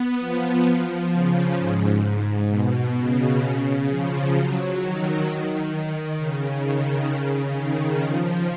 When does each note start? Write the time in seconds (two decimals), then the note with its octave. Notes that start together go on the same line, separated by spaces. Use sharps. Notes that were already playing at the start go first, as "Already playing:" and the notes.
Already playing: B3
0.19 F3
1.12 C#3
1.57 G#2
2.49 B2
2.95 C#3
3.88 F3
4.33 F#3
4.79 D#3
5.25 D#3
6.17 C#3
6.63 D#3
7.10 C#3
7.56 D#3
8.02 F3